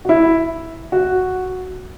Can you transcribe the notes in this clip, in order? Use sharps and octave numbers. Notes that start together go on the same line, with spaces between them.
F#4
E4
F#4